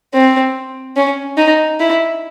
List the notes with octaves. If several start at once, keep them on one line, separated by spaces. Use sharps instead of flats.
C4
C#4
D#4
E4